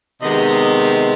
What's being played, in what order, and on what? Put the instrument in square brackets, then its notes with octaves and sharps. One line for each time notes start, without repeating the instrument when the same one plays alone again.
[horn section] C3 D#3 G#3 B3 D#5